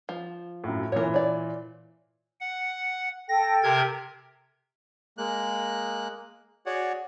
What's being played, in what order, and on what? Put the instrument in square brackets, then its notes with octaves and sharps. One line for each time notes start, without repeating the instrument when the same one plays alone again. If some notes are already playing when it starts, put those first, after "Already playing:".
[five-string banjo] F3
[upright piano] F#2 A2
[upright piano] A#2 E3 [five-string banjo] A#4 C#5
[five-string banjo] C#5 D5
[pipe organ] F#5
[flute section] A4 G5 [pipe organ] A#6
[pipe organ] C3 A#4 G#6
[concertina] G#3 A#3 F#6
F#4 G#4 C#5 D5 F#5